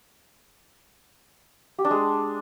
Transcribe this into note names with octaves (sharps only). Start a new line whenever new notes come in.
G4
D4
G#3